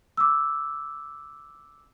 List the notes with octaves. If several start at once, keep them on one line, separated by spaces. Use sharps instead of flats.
D6 E6